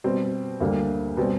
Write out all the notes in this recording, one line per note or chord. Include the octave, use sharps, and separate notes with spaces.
B2 G3 C4
D2 D3 G3 A#3
B2 G3 C4